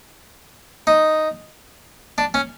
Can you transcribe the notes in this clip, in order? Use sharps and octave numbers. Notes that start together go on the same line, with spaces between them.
D#4
D4
C#4